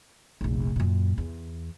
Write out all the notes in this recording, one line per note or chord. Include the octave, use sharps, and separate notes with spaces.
F1 A#1
F#2 A#2
E2